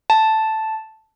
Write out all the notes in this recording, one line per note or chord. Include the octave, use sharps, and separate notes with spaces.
A5